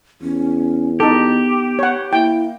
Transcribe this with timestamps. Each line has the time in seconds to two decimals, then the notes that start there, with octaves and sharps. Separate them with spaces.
0.21 E2 C#4
1.00 B3 D#4 G4 A4
1.79 C#5 F#5
2.13 A#3 E4 G5